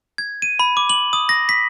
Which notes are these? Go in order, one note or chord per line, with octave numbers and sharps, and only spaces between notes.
G#6
D#7
B5
D6
F#7
D#6
A#6
B6